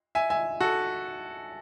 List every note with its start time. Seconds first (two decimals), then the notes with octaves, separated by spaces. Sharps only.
0.15 E5 G#5
0.30 E5 G#5
0.60 F#4 A4